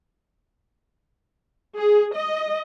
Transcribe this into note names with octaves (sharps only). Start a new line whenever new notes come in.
G#4
D#5